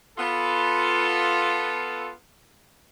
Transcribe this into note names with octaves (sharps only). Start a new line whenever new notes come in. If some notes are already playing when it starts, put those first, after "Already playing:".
B3 F4 A4